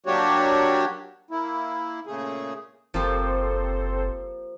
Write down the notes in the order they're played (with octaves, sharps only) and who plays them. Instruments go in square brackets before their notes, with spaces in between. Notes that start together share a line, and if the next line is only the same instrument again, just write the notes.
[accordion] F#3 A#3 D4 F#4 G4 C#5
A#3 E4
A#2 C#3 A3 G#4
[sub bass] F#1 [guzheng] F3 A#3 G4 [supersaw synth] C4 A4 C5